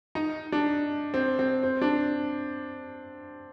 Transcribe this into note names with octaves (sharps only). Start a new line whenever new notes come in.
D#4
D4
C4
C4
C4
D4